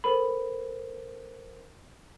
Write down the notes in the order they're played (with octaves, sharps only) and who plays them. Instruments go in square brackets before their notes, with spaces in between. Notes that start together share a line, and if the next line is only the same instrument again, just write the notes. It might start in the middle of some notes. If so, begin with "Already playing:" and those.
[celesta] A4 A#4 C5 [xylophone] B5